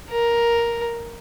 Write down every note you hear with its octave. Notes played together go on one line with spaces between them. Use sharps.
A#4